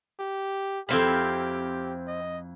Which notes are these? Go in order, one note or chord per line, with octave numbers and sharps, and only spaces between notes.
G4
F2 C4 E4 G4 F5 B5
D#5